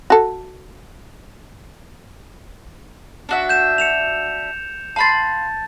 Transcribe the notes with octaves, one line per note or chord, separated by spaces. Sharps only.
F#4 A4
D4 F#4 E5
G6 E7
C#7 E7 F7
F5 A5 B5 C6 A6